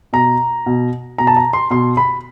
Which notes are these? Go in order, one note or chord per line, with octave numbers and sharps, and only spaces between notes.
B2 A#5
B2
B2 A#5
A5
A#5
C6
B2 C6
B5